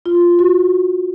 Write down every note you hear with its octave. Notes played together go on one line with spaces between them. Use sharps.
F4
F#4